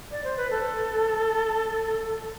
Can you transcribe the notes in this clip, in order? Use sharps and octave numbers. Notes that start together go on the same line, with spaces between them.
D5
C5
B4
A4